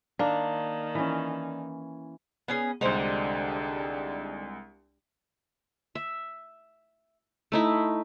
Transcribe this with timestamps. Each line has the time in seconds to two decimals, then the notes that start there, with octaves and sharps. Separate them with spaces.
0.19 D#3 A#3 D4
0.95 E3 C#4
2.48 B3 C#4 G#4
2.81 C2 D3 G#3 D4 D#4 G4 C5
5.95 E5
7.52 A3 D#4 E4